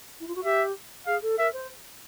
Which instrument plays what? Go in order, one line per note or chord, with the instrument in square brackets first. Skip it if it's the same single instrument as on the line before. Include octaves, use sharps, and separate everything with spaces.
[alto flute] E4
F4
F#4
[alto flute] G4 [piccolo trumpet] E5
[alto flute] G#4 [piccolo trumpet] F5
[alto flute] A4
[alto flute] A#4 [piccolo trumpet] E5
[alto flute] C5